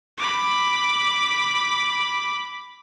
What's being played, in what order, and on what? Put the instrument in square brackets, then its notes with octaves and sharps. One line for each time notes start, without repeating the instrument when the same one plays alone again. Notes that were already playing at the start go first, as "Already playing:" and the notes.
[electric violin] B5 D6